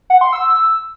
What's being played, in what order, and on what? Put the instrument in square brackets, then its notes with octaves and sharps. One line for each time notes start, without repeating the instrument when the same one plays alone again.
[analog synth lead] F#5
C6
E6